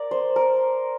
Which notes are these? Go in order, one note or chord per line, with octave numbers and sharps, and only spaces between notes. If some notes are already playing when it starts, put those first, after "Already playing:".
Already playing: A#4 D5
C5
A#4